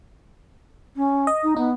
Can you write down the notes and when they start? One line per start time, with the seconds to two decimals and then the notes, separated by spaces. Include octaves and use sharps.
0.96 C#4
1.27 D#5
1.43 D#4
1.56 B3 D#4